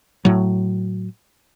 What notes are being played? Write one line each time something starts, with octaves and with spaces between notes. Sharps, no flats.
A2 F#3